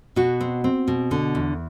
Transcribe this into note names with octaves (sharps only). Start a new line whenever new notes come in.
B2 F#4
C4
C4
B2
D3
E2